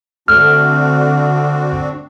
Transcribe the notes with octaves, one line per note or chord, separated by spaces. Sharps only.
D3 A3 C4 D4 F#4 F6